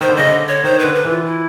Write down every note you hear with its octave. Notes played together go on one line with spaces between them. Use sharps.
D#3 C5
D3
C#3 D#5
D3
C#5
D#3 C5
D3 B4
B4
E3
F4
E4